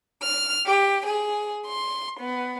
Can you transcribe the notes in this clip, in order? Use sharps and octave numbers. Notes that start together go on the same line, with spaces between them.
F6
G4
G#4
C6
B3